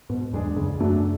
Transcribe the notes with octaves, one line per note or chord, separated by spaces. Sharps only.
G#2 B2
E2 G#3 D4 G#4
F#2 C#3
E2
F#2 F#3 A3 D4